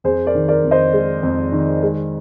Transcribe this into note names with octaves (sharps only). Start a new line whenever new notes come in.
F2 G#4 C5
A#4 D5
D#3
A#4 D5
F2
C5 D#5
G#3
F2
D#3
G#3